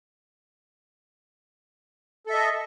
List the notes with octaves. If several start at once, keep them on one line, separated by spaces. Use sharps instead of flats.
A4 D#5 E5